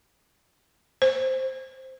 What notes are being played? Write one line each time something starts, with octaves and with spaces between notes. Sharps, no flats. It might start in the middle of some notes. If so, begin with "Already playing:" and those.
C5